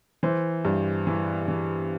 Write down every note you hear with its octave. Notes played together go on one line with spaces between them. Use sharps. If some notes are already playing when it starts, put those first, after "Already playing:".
E3 C5
G2
E3
E3